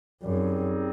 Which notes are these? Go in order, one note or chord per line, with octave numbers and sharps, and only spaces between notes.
F#2 G3 C4 D#4 G#4